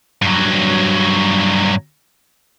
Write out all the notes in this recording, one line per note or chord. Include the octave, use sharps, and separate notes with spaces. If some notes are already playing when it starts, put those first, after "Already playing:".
G2 F#3